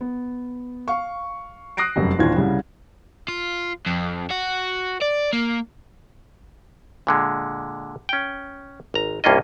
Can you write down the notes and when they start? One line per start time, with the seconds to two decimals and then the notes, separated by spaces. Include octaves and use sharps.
0.01 B3
0.88 F5 C#6
1.77 D#6 F#6 A#6 C7 D7
1.96 F1 F#2 G3
2.19 D#1 D#2 E3 D4 F4 G#6
2.36 C2 C#3 G3
3.28 F4
3.86 F2
4.31 F#4
5.02 D5
5.33 A#3
7.07 A#2 D3 G#3
8.09 C#4 G5
8.94 G#1 A#5
9.24 C2 G2 A#3 C#4 F4 D#5